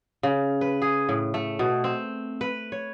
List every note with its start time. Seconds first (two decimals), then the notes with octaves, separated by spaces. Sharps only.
0.23 C#3
0.61 B4
0.82 G#4
1.09 A2
1.34 A3
1.59 B2
1.84 C4
2.41 B4
2.72 C#5